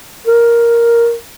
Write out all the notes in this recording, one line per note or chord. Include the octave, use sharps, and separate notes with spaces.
A#4